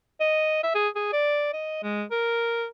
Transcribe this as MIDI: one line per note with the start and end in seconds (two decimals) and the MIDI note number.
0.21 0.62 75
0.63 0.72 76
0.75 0.88 68
0.95 1.10 68
1.13 1.50 74
1.53 1.81 75
1.83 2.04 56
2.11 2.66 70